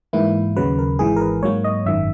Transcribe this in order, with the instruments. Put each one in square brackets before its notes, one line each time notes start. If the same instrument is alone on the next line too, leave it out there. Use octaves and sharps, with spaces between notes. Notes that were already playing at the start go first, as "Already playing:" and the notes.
[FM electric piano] G#2 E3 A#3 E4
D#2 C#3 F#3 B4
A#4
G#1 G#2 E3 G#4
A#4
B4
G#2 F#3 A#3 C#5
D#5
G#1 F#2 D#3 E5